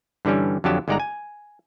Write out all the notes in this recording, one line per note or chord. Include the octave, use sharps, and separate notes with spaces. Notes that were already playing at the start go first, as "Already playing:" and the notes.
G2 D3 E3 G3 C#4
F2 D3 F#3 G4 A5
G1 G#3 D#4 D5 F#5 A#5
G#5